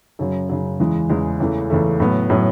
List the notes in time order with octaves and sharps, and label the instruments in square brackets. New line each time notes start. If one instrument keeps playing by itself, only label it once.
[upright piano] F#2 C#3 F#3
F#2 C#3 F#3
E2 C#3 E3 G#3
E2 C#3 E3 G#3
E2 C#3 E3 A3
E2 C#3 E3 A3
A2 F#3 B3
A2 F#3 B3